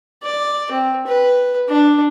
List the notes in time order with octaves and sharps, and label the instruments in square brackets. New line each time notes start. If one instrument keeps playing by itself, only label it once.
[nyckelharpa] D5
C4
B4
D4